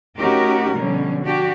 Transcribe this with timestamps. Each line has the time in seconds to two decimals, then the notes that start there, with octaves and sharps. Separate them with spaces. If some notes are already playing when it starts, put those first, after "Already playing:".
0.16 A3 C#4 D#4 F#4 G4 A#4
0.75 B2 D3 F3 G3 C#4
1.23 D4 F#4 G4